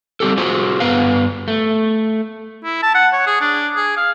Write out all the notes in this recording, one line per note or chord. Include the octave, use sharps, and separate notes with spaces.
G3 C4 G4 A4
F4 F#4 G#4 C5
G2 B3 B4 F5
A3
E4
A5
F#5
C#5
G#4
D4
G#4
F5